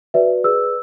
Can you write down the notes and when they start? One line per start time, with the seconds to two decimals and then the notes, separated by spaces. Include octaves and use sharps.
0.14 F#4 B4 D5 E5
0.44 G#4 B4 D5 E6